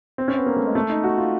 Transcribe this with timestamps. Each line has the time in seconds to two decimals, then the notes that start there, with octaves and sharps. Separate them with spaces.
0.18 C4
0.28 C#4
0.38 B3
0.46 A#3
0.56 A3
0.66 G#3
0.75 A3
0.89 D#4
1.04 F#4
1.18 F4